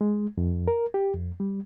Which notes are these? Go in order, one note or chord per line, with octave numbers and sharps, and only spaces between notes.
G#3
F2
A#4
G4
F2
G3